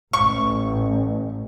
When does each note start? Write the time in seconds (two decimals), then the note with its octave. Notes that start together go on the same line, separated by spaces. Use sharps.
0.13 A1 C#6